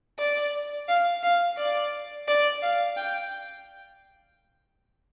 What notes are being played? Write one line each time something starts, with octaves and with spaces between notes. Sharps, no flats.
D5
F5
F5
D5
D5
F5
G5